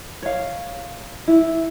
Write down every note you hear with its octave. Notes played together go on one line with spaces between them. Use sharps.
C#5 F5
E4